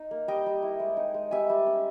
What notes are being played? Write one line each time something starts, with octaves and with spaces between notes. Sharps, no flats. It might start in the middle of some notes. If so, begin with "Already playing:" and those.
Already playing: D#4
A#3
G3 D#5 G5
G3
E4
G#3
D#4
G#3
G3 E5 G#5
G3
C#4